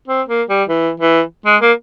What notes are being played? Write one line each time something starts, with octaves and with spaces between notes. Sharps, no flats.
C4
A#3
G3
E3
E3
G#3
A#3